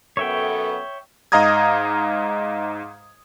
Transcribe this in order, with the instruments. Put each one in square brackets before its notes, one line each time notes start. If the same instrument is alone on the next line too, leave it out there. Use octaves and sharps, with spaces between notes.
[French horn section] F#2 B3 A4 [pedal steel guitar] C#5 E5 G5
[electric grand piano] G#2 D#5 F5 A#5 D#6 G#6